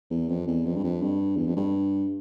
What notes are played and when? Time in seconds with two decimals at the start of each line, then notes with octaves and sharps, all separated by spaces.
0.10 E2
0.29 F2
0.47 E2
0.66 F2
0.76 G2
0.84 F2
1.02 G2
1.36 E2
1.47 F2
1.57 G2